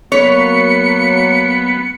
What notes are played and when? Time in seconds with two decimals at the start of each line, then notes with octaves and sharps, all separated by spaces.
0.12 F#3 A#3 B3 C#5 C#7